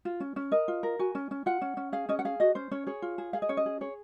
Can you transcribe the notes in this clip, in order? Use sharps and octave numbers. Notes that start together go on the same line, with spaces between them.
F4
C#4
C#4
A#4 D#5
F4
A#4
F#4 G#5
C#4
C#4
F4 F#5
C#4
C#4
G#4 F5
C#4 D#5
F#5
G#4 F5
F#4 D#5
C#4 C5
C#4 C#5
G#4 C#5
F4
G#4
G#4 F5
D#5
C#4 C#5
D#5
G#4
G#4 C#5